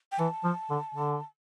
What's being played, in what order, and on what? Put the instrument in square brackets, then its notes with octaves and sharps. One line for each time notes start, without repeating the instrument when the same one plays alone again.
[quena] G5
[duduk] E3 [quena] A5
[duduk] F3
D3
D3